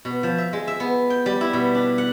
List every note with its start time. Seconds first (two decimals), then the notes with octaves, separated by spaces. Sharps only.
0.05 B2
0.23 F3
0.38 E5
0.53 G#3
0.68 E5
0.80 B3
1.10 G5
1.26 G3
1.41 E4
1.53 B2
1.75 D4
1.98 F#5